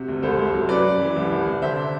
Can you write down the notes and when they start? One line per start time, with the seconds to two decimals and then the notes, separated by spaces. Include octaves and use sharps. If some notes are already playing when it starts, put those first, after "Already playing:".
Already playing: C3 F#4
0.08 D2
0.22 C2 A4 C5
0.39 C2
0.54 F#3
0.69 F#2 B4 D5
0.84 F#2
1.00 E3
1.16 C2
1.31 C2
1.46 C2
1.62 D3 C5 E5